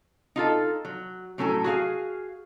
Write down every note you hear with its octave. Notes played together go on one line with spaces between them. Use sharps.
D#4 F4 A4
F#3
A2 F#3 C#4 A4 G#5
F#4 G#4 F5 G#5